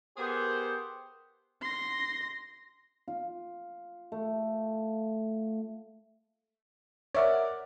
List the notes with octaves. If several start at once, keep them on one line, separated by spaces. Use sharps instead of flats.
B3 G4 G#4 A#4 C5
C6 A#6
F4
A3
A#4 C#5 D5 E5 F#5